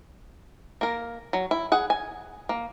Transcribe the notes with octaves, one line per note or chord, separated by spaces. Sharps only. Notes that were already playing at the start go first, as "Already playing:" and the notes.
A#3 A#4
F#3
E4
G#4 F#5
G#5
A#3